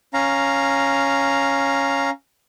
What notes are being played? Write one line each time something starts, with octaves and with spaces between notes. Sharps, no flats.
C#4 F5 A#5